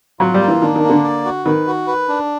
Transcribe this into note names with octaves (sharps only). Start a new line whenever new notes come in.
F#3 F4
G3
A#3
E3
D#3 D4
D#3
A#3
D3
D5
F#4
D#3 B4
F#4
B4
D4